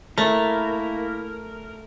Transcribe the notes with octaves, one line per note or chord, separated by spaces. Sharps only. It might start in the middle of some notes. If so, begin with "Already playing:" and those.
A3 A#3 E4 A#4